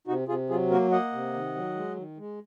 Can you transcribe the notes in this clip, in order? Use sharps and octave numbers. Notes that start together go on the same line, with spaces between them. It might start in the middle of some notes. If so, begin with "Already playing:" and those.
C3 D#4 F#4
C3 F4 G#4
F#3 F4 G#4
A#3 F#4 A#4
A#3 D#5 F#5
C3
D#3
F#3
G#3
D#3
G#3